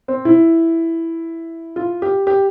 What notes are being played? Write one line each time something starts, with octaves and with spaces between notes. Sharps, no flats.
C4
E4
F4
G4
G4